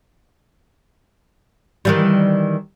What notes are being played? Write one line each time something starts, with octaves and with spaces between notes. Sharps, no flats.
D#3 E3 G3